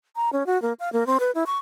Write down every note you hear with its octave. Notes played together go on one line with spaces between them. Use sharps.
A#5
C#4
F#4
A#3
F5
A#3
C4
B4
E4
C#6